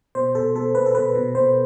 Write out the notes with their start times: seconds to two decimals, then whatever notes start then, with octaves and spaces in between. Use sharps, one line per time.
0.15 B2 C5
0.35 B2 A4
0.55 B2 A4
0.75 B2 B4
0.86 A4
0.95 B2 B4
1.15 B2
1.35 B2 C5